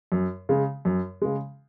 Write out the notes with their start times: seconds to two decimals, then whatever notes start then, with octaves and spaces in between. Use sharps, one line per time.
0.12 F#2
0.49 C#3 G#3
0.85 F#2
1.22 C#3 G#3